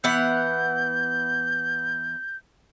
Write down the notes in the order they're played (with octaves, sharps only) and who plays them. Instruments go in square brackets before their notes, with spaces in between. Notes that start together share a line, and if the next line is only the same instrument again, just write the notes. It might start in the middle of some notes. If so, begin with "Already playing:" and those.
[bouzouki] E3 B3 F#5 [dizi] G6